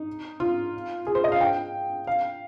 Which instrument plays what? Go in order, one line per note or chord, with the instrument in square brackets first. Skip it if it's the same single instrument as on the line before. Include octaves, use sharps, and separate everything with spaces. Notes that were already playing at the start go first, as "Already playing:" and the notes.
Already playing: [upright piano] D#4
F4
G#4
C5
D#5
F5
G5
F5